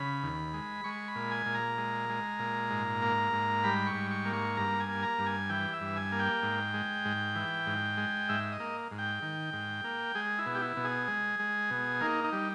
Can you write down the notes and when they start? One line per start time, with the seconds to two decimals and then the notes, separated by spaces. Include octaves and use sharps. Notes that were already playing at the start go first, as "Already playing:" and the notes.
Already playing: C#3 B5
0.23 D#2
0.54 G#3
0.84 G#3 C#6
1.08 B5
1.15 A#2
1.31 G#5
1.46 A#2
1.54 A#5
1.78 G#3
2.09 G#3
2.39 A#2
2.70 G#2
3.02 A#3
3.33 G#2
3.64 G3 B5
3.87 C#6
3.94 G#2
4.11 C#6
4.25 A#3
4.33 C#6
4.57 G2 A#5
4.80 G#5
4.88 A#3
5.03 A#5
5.19 G2
5.26 G#5
5.49 E3 G5
5.74 E5
5.81 G2
5.96 G#5
6.12 A#3
6.19 G5
6.43 G#2
6.74 G#3
7.05 G#2
7.35 E3
7.67 G#2
7.97 G#3
8.29 G#2 E5
8.52 D#5
8.60 A#3
8.91 G#2
8.98 G5
9.22 D#3
9.53 G#2
9.84 A#3
10.15 G#3 G#4
10.39 E4
10.46 B2
10.55 G4
10.62 E4
10.77 B2
10.84 G#4
11.08 G#3
11.39 G#3
11.70 B2
12.01 A#3 D#4
12.24 D#4
12.32 G3